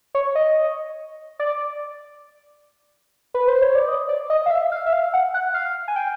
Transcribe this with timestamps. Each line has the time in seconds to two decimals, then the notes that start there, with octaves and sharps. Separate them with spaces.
0.15 C#5
0.35 D#5
1.39 D5
3.34 B4
3.48 C5
3.61 C#5
3.75 D5
3.88 D#5
4.09 D5
4.30 D#5
4.46 F5
4.51 E5
4.72 F5
4.86 E5
4.93 F5
5.14 F#5
5.34 F#5
5.54 F5
5.88 G#5
5.96 G5